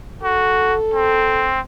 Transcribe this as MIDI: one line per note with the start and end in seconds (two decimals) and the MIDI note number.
0.23 0.75 66
0.23 1.52 69
0.94 1.60 60